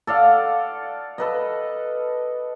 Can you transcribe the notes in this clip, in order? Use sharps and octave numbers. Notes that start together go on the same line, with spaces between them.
A4 D5 F5 F#5
A4 B4 D#5